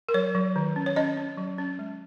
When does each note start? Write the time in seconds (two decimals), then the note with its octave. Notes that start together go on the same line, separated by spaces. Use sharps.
0.09 A#4
0.14 F#3 C#5
0.35 F#3
0.56 D#3
0.76 C#4
0.86 C#5
0.96 C#4 D#5
1.17 C#4
1.37 F#3
1.58 C#4
1.79 G#3